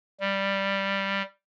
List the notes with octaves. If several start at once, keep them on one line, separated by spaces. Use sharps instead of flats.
G3